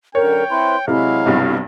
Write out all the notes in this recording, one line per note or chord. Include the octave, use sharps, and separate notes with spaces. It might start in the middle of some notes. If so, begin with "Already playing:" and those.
F#2 D3 A#4 C#5 G5
C4 E4 B4 C6
C3 F#3 G#3 E4 F5
B1 G2 C3